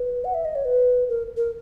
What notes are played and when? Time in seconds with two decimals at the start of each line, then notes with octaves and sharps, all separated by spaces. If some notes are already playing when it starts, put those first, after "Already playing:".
Already playing: B4
0.25 F#5
0.34 E5
0.45 D#5
0.55 C#5
0.65 B4
1.09 A#4
1.37 A#4